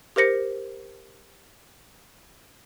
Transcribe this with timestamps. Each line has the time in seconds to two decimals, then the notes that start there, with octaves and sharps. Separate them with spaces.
0.16 G4 A#4 C5 A#6 C#7